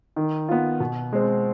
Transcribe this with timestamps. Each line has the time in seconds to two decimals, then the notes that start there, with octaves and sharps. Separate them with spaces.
0.16 D#3
0.49 B3 F4
0.80 B2
1.13 G#3 C4